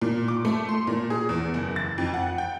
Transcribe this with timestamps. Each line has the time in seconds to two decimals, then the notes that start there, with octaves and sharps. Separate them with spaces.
0.01 A#2
0.28 D6
0.45 A3
0.69 C6
0.87 A#2
1.10 G#4
1.29 E2
1.54 F#1
1.76 A6
1.98 F2
2.14 F#5
2.38 G5